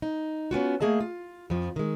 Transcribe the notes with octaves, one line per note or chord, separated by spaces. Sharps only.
D#4
B3 C#4 F4 F#4
A3 A#3 G#4 D#5 A5
F4
F2 F3
D#3 G#3